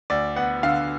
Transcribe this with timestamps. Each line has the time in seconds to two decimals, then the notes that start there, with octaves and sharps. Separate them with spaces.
0.10 D2 D5
0.36 B3 F#5
0.63 D3 F5